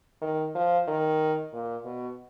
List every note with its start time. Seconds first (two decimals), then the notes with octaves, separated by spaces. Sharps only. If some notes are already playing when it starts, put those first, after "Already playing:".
0.22 D#3
0.55 F3
0.87 D#3
1.53 A#2
1.85 B2